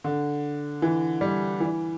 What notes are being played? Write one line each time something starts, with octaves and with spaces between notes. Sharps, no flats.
D3
E3
G3
E3